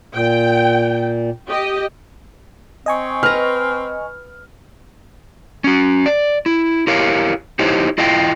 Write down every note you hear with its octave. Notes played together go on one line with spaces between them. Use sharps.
A#2 G5
G4 D#5
C4 D#5 G#5 C#6
B4 A#5 F6
C#4 F#4
D5
E4
E4 G4 A#4 C#5 F5
D#4 E4 G4 C5 C#5 D#5
E4 F4 D#5 F5 G5